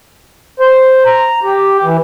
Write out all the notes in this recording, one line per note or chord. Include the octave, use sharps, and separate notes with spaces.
C5
A#5
G4
E3